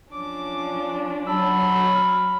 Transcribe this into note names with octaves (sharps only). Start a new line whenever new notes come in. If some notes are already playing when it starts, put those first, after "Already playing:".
F3 C#4 D4 D6
F#3 A5 B5 E6
F6